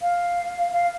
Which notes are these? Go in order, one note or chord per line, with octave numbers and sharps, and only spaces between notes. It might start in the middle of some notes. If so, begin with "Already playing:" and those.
F5
F5